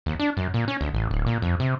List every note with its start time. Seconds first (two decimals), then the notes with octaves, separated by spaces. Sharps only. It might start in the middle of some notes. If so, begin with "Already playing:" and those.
0.06 D#2
0.20 D4
0.37 F#2
0.54 A#2
0.68 C#4
0.81 D2
0.94 A1
1.11 D1
1.26 A#2
1.42 F2
1.60 C3